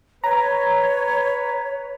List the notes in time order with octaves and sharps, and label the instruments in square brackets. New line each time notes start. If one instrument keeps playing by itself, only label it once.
[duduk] B4 [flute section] C#5 [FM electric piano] A#5